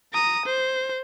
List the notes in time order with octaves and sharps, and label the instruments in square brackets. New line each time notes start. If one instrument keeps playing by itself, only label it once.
[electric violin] A#5 D#6
C5